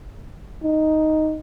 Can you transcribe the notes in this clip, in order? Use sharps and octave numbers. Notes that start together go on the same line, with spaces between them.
D#4